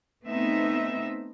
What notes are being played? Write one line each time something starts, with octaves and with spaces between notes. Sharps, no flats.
A3 B3 C4 D#4 E5